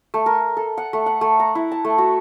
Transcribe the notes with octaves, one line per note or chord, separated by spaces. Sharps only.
A3
A#4
A4
F#5
A3
F#5
A3
A#5
E4
A5
A3
F#4